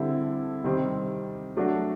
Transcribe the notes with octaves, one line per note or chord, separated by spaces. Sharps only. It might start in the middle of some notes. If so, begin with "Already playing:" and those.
Already playing: D3 G3 C4 E4 A4
C3 D#3 G3 C4
F#3 A3 D4 F#4